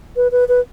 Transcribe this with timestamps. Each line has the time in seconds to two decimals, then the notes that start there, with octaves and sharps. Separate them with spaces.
0.16 B4
0.32 B4
0.48 B4